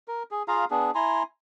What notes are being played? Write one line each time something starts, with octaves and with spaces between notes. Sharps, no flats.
A#4
G#4
F4 G#4 F5 A#5
B3 D4 G#4
E4 G#5 A#5 C6